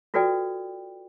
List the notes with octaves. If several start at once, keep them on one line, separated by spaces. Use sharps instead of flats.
F4 F#4 A4 B4 D5 G5